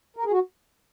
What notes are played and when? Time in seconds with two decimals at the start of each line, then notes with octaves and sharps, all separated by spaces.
0.17 A#4
0.24 G#4
0.32 F#4